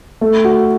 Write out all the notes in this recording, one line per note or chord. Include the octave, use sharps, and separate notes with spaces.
A3
F#4